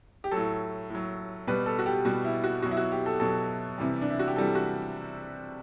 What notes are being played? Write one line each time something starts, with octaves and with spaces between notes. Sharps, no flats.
G4
A2 F#3 A4
A2 F#3
B2 G3 B4
A4
F#4
G4
B2 G3 F#4
E4
F#4
B2 F#3 F#4
E4
F#4
G4
A4
B2 F#3 A4
C3 E3 G3
D4
E4
F#4
G4
C3 E3 G3 A4
F#4